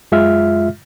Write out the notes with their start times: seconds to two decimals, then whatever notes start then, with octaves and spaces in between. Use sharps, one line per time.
0.12 F#2 G#3 F4 E5 F6